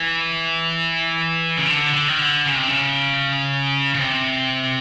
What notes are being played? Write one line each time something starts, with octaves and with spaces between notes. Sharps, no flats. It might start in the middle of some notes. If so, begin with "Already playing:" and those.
Already playing: E3
C#3
D3
D3
D#3
D3
C#3
C3
C#3
C#3
C3